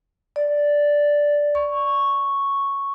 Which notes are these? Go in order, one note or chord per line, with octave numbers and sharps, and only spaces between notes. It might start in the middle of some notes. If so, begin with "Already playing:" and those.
D5
C#6